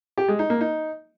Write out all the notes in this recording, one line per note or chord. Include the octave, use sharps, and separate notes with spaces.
G4
G#3
D#4
A#3
D#4